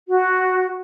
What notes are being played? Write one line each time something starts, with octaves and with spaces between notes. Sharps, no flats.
F#4